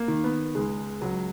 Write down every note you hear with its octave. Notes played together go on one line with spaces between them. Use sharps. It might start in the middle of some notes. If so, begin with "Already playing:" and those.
Already playing: A#3
D#3
B3
C#2 G#3
C#2 F#3